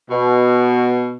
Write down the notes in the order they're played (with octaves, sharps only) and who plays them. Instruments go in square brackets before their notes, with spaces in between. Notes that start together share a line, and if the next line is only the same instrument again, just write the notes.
[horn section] B2